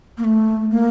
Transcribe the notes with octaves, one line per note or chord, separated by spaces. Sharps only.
A#3
A3
A#3